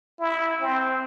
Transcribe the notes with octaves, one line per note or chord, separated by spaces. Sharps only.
E4
C4